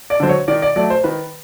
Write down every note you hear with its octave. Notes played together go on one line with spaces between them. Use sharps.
D5
D3 F#3 C5
C#5
D#3 D5
D5
F#3 A3 D5
C5
D#3 B4